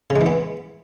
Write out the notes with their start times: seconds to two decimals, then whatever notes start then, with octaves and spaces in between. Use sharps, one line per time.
0.10 C#3
0.16 G#3
0.21 E3
0.26 B3